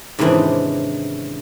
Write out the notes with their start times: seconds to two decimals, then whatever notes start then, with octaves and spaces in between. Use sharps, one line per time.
0.19 G#2 C3 D#3 E3 C#4 D4